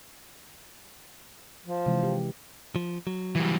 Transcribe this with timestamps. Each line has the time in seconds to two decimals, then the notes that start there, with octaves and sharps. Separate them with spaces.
1.66 F3
1.86 C3 E3 G#3
2.03 G4
2.76 F3
3.07 F#3
3.35 E3 G3